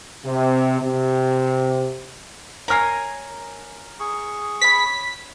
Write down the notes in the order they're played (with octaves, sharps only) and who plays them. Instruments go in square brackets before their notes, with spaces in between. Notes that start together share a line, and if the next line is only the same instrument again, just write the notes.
[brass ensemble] C3
C3
[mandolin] A#4 C#5 G#5 [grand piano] A#5 F6 C7
[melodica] G#4 C#6
[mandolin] C#5 B5 [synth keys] B6